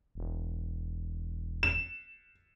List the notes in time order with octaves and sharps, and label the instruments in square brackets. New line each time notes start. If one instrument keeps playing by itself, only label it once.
[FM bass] E1
[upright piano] E7